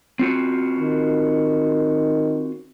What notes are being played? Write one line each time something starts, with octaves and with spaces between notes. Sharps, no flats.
C4 F4 F#4
D#3